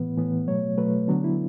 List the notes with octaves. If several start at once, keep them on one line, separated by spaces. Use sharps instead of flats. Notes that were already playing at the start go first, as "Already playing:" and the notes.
Already playing: A2 E3 B3 B4
A2 E3 B3
B2 F#3 A3 C#5
B2 F#3 A3 B4
D3 F#3 B3 D4
E4